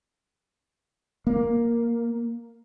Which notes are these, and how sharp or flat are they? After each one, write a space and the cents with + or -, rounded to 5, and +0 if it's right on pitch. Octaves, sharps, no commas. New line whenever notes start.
A#3 +5